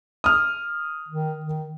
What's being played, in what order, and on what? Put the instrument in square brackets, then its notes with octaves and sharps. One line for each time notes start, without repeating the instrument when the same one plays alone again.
[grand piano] D#6 F6
[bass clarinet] D#3
D#3